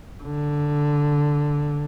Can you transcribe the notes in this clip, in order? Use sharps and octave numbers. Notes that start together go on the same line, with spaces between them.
D3